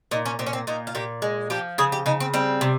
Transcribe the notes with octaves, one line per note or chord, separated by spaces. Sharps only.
A#2 D#4
C#4
A#2 C4
C#4
C4
A#2 D#4
F4
A#2 G4
G#3
F3 G4
C#3 G#4
G4
C#3 D#4
C4
G3 C4
C3